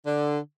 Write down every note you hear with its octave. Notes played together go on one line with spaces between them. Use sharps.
D3